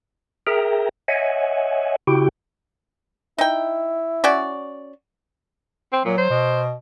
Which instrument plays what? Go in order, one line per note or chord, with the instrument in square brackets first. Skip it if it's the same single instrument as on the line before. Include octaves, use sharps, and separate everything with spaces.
[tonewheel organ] G#4 A#4 E5 G5 A#5
C#5 D#5 E5 F#5 G#5
C#3 E4 F#4 G4 G5
[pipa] D#4 G5 [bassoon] E4
[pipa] C#4 F#4 D5
[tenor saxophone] C4
[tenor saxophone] A#2 [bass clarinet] F#3
[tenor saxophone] C5
[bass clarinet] B2